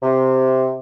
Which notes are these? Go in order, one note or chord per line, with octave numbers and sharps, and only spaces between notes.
C3